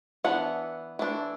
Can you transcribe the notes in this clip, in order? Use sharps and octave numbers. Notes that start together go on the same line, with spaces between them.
E3 B3 D4 F#5
E3 A3 D4